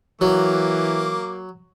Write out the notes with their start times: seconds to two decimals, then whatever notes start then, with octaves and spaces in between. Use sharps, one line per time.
0.21 E3 F#3 A#3 D6